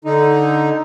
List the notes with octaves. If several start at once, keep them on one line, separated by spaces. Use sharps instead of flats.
D3 D#4